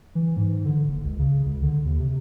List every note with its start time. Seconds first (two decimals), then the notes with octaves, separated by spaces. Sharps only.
0.15 E3
0.37 G#2
0.65 D3
0.88 F#1
1.04 C#2
1.19 C#3
1.45 C#2
1.62 D3
1.85 D#2
1.99 C3